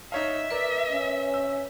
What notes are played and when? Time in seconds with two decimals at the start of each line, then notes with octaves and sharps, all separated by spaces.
0.12 D#4 C#5 E5 F5
0.50 A#4 B4 D5
0.92 C#4
1.34 E6